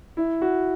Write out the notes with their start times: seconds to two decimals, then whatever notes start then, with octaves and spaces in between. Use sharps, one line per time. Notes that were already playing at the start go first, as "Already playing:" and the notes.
0.17 E4
0.42 F#4